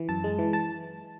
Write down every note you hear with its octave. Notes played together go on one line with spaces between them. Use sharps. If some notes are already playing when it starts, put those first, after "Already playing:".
Already playing: E3
F#2 A5
G#3
E3
A5